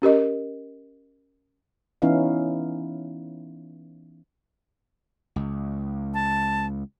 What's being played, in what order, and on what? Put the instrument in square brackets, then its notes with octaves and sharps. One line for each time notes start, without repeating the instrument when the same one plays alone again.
[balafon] C#4 G4 A#4 D#5
[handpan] E3 B3 C#4 D#4 E4 F5
[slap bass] C#2
[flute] A5